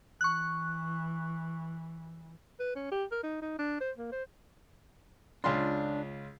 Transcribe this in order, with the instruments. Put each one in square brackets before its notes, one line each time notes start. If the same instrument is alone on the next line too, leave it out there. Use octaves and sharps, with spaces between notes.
[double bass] E3 [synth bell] C#6 F#6
[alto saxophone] B4
C#4
G4
A#4
D#4
D#4
D4
C5
A#3
C5
[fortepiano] C#2 F4 C6 [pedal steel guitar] D4